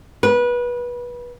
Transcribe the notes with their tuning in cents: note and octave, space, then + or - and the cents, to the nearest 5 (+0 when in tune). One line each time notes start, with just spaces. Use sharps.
B4 -25